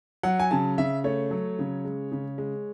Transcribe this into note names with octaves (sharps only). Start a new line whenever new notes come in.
F#3 F#5
G#5
C#3 A5
C#3 E5
A3 C#5
F#3
C#3
G#3
C#3
G#3